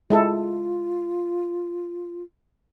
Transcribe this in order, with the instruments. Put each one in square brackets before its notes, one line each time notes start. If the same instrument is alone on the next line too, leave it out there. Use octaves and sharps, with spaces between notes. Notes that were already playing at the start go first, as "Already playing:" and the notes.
[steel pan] G#3 E4 A4 [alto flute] F4